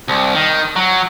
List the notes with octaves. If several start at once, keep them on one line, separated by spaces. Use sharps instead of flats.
C2
D#3
F#3